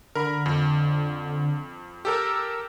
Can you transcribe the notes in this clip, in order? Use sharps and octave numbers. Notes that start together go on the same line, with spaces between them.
D3 A#4 B5
F2
G4 A4 A#4 E6